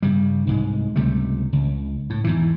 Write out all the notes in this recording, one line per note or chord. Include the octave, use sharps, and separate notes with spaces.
G2 C#3 G3
C2 G#2 G#3
C#2 C3 G3 A3
C#2
A2
E2 G#2 E3